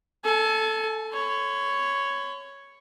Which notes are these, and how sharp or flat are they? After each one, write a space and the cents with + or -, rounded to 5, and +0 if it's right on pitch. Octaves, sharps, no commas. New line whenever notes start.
A4 +0 G#5 +35
C#5 +0 B5 +40